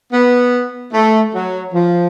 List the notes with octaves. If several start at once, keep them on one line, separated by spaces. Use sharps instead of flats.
B3
A3
F#3
F3